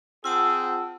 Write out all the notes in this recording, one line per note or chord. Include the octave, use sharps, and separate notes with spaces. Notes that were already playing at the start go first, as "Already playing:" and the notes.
C4 F4 G#4 F#5 A5 E6